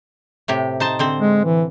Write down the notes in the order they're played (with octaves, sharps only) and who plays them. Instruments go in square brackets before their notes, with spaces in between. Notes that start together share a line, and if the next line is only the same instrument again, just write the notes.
[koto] A2 C3 G4
D#4 C5 A5
D3 C4 C5
[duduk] G#3
E3